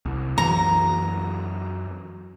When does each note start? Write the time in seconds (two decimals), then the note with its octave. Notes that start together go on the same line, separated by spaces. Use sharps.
0.05 C2
0.38 F#2 E3 F#3 A#5